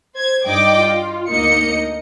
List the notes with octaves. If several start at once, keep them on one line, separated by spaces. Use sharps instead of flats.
C5 G#6
G2 D#4 D5 D#5 G5 D6
F4
D2 A#3 D#4 D#5 C#7